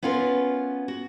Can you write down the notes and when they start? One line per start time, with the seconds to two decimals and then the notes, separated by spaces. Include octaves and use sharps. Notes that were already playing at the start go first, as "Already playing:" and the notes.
0.03 B3 C#4 F4 A#4 B4
0.88 F#4